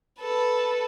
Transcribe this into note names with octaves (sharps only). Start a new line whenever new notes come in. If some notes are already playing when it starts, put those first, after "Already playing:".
A4 B4